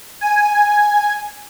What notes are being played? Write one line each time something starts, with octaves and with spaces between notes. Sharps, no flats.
G#5